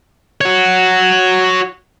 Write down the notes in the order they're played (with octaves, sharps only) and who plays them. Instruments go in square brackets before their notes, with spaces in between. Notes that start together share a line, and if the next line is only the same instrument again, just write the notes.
[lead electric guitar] F#4 C#5